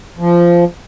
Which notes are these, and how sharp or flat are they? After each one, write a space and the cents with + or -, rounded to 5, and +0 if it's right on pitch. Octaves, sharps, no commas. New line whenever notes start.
F3 -15